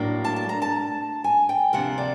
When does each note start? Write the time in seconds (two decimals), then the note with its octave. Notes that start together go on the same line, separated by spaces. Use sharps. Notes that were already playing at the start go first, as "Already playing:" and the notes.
Already playing: A2 F#3 A#3 D4
0.24 A5
0.36 A5
0.49 A#5
0.62 A5
1.24 G#5
1.49 G5
1.73 D2 C3 F3 A#3 F#5
1.98 D5